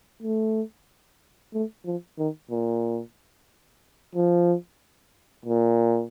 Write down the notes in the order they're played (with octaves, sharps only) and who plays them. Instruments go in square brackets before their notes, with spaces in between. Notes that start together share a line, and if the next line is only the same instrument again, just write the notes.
[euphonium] A3
A3
F3
D#3
A#2
F3
A#2